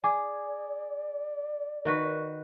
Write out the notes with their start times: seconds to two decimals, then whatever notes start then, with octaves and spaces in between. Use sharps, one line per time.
0.04 G#4 D5 G#5 D6
1.85 D#3 F#4 A#4 B4 C#6